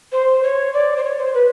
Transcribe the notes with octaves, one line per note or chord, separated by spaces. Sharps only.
C5
C#5
D5
C5
C#5
C5
B4